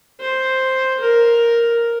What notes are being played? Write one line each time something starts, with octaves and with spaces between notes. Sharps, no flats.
C5
A#4